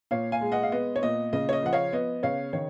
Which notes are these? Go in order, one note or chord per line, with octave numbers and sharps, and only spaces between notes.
A#2 C#5 F5
F5 G#5
G#3
D#5 F#5
F5
B3 D#5
C#5
A#2 D#5
C#3 D#5
C#5
D#5
F3 F#5
C#5 F5
B3 D#5
C#3 C#5 F5
D#3 C#5